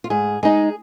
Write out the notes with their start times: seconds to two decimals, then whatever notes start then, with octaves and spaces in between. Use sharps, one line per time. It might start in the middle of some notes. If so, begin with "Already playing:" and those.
0.04 F4
0.10 G#2 G#4
0.43 G#3 D#4 G#4